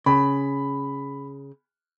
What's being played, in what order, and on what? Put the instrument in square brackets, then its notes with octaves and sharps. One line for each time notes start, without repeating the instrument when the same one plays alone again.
[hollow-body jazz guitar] C#3 [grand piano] B5